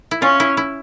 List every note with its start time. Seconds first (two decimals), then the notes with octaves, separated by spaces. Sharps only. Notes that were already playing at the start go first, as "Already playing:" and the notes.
0.11 E4
0.22 C#4 F4
0.40 E4
0.57 E4